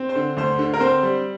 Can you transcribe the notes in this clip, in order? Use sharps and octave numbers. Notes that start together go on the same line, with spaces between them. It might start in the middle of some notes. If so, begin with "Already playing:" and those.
Already playing: C4
C5
D3
D2 C5
D3
A#4
C4 C5
G3